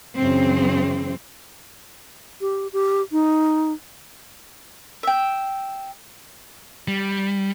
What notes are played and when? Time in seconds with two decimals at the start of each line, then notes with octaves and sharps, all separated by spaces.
0.18 F#2 C#3 E3 C4
2.41 G4
2.73 G4
3.12 D#4
5.03 E5 G5
6.88 G3